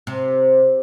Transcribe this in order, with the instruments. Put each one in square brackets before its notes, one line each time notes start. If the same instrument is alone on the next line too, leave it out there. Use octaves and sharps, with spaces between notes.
[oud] C3